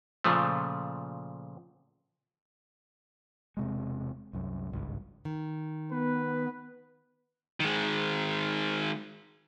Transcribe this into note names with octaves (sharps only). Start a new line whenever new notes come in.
A#2 C#3 F3 A3
E1 C3 G#3
C2 F#2
G#1 C#2 G2
D#3
B3 B4
D#3 G#3